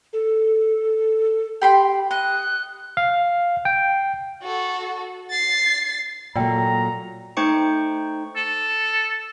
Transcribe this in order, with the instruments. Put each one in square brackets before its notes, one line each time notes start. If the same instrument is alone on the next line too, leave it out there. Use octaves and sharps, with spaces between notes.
[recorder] A4
[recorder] G4 [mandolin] G5 B5 C6
[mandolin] D#5 [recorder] F#6
[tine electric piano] F5
G5
[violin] F#4 A4
A6 C7
[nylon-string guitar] A#2 F#3 A3 [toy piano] D5 G5 [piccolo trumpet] A#5
[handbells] A3 D#4 C5 G5 C#6 C#7
[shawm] A4